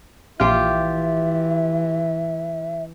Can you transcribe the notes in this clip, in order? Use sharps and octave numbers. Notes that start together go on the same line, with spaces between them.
A#1 E3 F4 G4 E5 F6